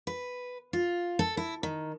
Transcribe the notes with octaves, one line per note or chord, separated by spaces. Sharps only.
B4
F4
A4
E4
D#3